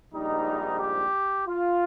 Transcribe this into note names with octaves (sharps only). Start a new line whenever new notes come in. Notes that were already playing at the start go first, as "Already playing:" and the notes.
A#1 G#2 G3 D#4
G4
F4